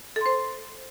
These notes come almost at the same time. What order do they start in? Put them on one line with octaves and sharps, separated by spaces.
A4 C6 C5